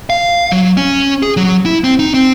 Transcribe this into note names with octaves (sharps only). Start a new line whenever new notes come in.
F5
F#3
C#4
G#4
F#3
E4
C4
D#4
C4